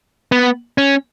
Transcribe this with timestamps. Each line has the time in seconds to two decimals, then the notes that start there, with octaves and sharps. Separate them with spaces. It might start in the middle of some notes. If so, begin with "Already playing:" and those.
0.32 B3
0.78 C#4